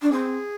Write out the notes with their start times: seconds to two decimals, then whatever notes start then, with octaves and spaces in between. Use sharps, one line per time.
0.02 D4
0.12 C4 G#4